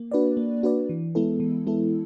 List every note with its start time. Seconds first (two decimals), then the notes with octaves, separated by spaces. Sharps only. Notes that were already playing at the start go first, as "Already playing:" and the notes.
Already playing: A#3
0.12 D4 F#4 B4 D5
0.37 A#3
0.63 D4 F#4 B4 D5
0.89 E3
1.15 G#3 B3 E4 A4
1.40 E3
1.67 G#3 B3 E4 A4